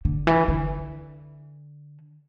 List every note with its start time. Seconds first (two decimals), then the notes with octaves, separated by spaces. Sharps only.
0.05 D3
0.27 E3
0.48 D3